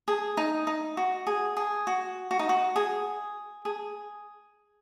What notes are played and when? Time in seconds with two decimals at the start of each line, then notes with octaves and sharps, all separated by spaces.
0.08 G#4
0.37 D#4
0.67 D#4
0.97 F#4
1.27 G#4
1.57 G#4
1.87 F#4
2.31 F#4
2.39 D#4
2.49 F#4
2.76 G#4
3.65 G#4